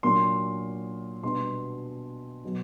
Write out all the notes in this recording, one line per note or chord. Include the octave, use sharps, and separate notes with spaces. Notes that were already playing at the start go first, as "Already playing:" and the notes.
A#2 F#3 A#3 D4 C6
B2 G3 B3 D4 C6
B2 F#3